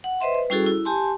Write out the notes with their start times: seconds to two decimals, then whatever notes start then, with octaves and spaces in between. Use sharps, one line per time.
0.04 F#5
0.21 B4 C5 D#5 E5 C6
0.34 B4
0.50 G3 C#4 E4 F#4 G#4 A4
0.67 E4
0.85 G4 G#5 A5 C6